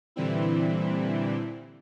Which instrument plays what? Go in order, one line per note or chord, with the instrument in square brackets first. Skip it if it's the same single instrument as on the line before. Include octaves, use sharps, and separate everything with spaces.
[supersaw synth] A#2 D3 E3 G3 C4 E4